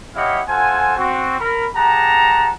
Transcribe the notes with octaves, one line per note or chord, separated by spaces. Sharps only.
E4 G4 C#5 D#5 F5 F#5
F4 A4 C5 F#5 G#5
C4 F#4
A#4 B5
G4 G#4 F#5 A5 A#5